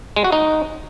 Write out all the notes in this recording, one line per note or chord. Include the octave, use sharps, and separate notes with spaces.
G#3
F#4
D#4